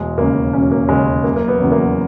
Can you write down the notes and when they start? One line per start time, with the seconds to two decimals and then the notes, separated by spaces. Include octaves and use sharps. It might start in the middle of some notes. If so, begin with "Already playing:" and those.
Already playing: E1 G#3
0.18 D#2 C#3 A#3
0.53 E1 C#4
0.72 A#3
0.88 D#2 C#3 G#3
1.24 F#1 A#3
1.36 A#3
1.48 B3
1.60 E2 C#3 F#3
1.72 A#3